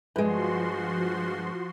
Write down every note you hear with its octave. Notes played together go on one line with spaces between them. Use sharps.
G2 F3 G#3 F#4 C6